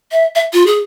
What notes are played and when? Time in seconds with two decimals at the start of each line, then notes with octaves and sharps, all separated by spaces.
0.12 E5
0.35 E5
0.53 F4
0.67 G#4